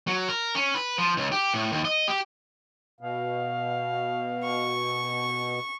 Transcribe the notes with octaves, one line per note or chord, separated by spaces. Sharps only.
F#3
A#4
C#4
B4
F3
C#2
G4
A2
D#2
D#5
G4
B2 F5
C#6